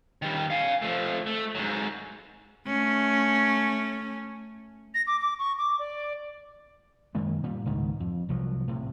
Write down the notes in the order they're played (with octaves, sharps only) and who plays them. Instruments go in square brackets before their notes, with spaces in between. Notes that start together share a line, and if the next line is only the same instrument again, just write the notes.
[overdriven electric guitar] D#3 G3
F5 G#5
F3 A3
A3
G#2 F#3
[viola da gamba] A3 C#4
[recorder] A#6
D6
D6
C#6
D6
D5
[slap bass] F#2 D#3 G#3 A#3
A#2 G3
C#2 G#2 D#3
F2
C2 F3 F#3
A2 C3